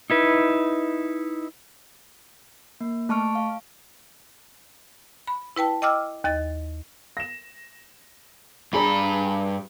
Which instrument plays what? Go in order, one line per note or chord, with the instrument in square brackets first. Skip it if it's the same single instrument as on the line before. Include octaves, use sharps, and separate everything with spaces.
[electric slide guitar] D#4 E4 B4
[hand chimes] A#3
A3 A5 C#6 F6 D7
F5
[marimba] B5
E4 B4 G5 A5
D#5 G5 D6 E6 F6
D#2 D#5 A6
[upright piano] A#6 E7
[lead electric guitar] G2 B5 [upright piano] D4 G#4 A#5